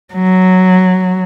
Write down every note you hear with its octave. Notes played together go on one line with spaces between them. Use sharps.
F#3